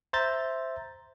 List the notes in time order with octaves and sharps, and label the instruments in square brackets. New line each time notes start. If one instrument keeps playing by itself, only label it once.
[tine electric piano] C5 E5 A#5 G6 A6